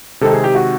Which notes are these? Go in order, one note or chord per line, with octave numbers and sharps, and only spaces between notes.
C3 D#3 G#3 C4 D#4 A4
G#4
G4
F#4